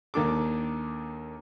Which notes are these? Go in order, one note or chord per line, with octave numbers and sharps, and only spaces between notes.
D#2 D#3 A#3 D4 A4 D6